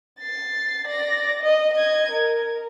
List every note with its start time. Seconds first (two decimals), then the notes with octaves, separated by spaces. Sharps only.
0.20 A6 C7
0.88 D5 A#6
1.43 D#5
1.74 D#5 G#6
2.12 A#4